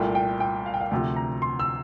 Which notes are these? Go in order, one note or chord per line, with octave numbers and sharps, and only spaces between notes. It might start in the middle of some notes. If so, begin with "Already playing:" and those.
Already playing: C2 A#2 A3 G5
G5
G5
F5
G5
F5
D2 C3 F3 G5
A#5
C6
E6